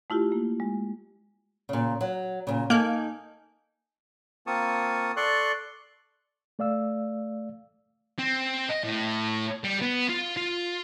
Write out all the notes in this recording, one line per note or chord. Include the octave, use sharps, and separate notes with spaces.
A3 E4 F4 G4
A#3
G#3
A#2 C#3
F#3
A#2 C#3
A#3 D#4 A4 G#5
A#3 C4 F4 A5 C#6 D#6
A4 D5 C6 C#6 F#6
A3 D5 F5 E6
C4
D#5
A2
G3
B3
F4
F4